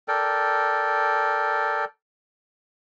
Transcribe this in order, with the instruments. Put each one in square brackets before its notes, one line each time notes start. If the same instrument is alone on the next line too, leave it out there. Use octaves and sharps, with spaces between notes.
[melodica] A4 A#4 D5 G5